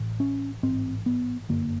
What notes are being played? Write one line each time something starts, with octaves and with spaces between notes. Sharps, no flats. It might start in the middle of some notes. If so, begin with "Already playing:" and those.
Already playing: A1 A2
C#4
A1 G#2 C4
B3
G1 F#2 D3 A#3